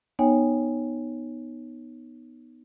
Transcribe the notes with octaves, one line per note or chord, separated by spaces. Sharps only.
B3 D#4 C#5 G5 G#5